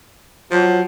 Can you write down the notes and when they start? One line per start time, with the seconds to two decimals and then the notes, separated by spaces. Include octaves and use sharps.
0.51 F3 F#3